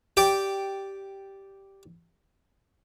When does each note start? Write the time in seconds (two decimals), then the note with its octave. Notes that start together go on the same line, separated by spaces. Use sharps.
0.17 G4 D5 G5